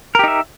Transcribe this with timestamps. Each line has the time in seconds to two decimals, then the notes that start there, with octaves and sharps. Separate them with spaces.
0.15 A#4
0.19 G4
0.23 D#4
0.28 E5